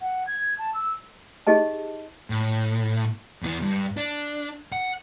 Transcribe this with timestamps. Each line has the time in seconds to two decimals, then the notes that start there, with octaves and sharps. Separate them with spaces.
0.01 F#5
0.27 G#6
0.58 A5
0.74 E6
1.47 D#4 G4 G#4 D#5 A5
2.30 A2
3.43 E2 E3
3.62 G2
3.97 D4
4.72 F#5